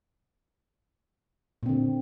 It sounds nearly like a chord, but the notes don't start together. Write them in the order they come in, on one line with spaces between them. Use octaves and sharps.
A#2 C4 D3